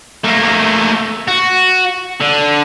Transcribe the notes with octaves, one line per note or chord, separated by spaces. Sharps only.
A3 A#3
F#4
D3